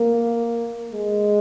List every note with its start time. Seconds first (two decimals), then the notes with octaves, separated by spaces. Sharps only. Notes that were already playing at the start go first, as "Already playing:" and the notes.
Already playing: A#3
0.91 G#3